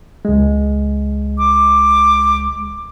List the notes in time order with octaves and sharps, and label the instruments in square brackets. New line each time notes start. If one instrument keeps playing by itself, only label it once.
[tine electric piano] C#2 G#3
[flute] D6